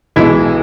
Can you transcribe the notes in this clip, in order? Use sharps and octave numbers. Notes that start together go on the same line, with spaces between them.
B1 B2 E3 G#3 E4